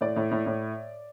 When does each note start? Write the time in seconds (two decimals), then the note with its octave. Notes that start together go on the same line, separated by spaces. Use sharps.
0.01 A2 D5
0.16 A2
0.31 A2
0.46 A2